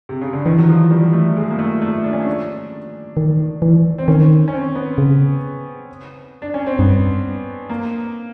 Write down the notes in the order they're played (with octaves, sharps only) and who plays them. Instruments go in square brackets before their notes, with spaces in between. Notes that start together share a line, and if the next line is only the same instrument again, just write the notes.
[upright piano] C3
C#3
D3
[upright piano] D#3 [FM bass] E3
[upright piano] F#3
F3
G3
A3
G#3
A#3
A3
A3
D4
C#4
D4
[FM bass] D#3
E3
[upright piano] C4
[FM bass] D#3 [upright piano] C#4
[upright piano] C#4
C4
B3
[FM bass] C#3
[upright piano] D4
C#4
C4
[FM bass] G2 [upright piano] B3
[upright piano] A#3